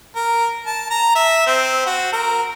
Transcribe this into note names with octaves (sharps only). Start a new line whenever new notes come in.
A#4
A5
A#5
E5
C4
F#4
A#4